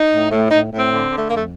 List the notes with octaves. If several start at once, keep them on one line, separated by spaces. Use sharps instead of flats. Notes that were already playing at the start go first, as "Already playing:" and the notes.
Already playing: D#4
A2
A2
A2 D#4
A2
C4
D3
D3
A3
F2 A#3
A3